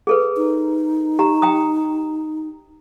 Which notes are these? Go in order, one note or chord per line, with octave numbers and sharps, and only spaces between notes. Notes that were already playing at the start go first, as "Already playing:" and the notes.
G#4 A4 B4
D#4
G4 A#5
G5 A#5 D#6